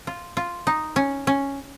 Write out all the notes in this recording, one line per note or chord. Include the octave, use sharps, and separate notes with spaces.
F4
F4
D#4
C#4
C#4